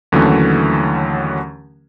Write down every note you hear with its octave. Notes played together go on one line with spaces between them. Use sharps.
D#2 D3 E3 F#3 A3 C#4